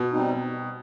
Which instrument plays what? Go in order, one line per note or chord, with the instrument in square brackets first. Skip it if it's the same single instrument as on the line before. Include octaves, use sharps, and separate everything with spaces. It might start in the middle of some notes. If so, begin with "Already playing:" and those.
Already playing: [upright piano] B2
[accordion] G3 C4 D#4